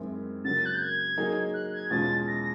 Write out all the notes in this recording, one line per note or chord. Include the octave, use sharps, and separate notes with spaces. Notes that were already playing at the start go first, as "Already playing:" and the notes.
Already playing: F#2 D#3 G#3 C4 E4
C#3 F#3 A#3 A6
F#6
G6
G#6
F#3 A#3 D#4 G#4
F#6
G#6
E2 B2 G#3 C#4 F4 A6
A#6